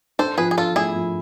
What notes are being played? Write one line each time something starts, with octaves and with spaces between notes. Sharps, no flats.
D4 A4 C5
F3 G#4 B4
G#4
D4 F4 A4
A3 E4 G#4
F3